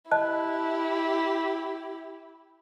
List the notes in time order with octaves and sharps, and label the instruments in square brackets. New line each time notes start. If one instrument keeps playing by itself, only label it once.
[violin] E4 G4 [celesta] D#5 A5 F#6